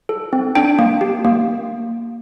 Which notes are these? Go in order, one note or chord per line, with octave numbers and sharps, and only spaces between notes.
A4
C4
D4 G5
A#3
G4
A#3